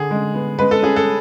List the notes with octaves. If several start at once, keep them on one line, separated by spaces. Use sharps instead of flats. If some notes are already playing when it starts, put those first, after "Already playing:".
Already playing: D3 G#4
G#3
B3
G#3 B4
A4
C#4 G#4
A4